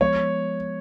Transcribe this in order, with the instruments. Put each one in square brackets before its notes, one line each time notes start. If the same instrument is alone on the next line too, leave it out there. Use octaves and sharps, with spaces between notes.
[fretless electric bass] F3 G#3 B3 [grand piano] C#5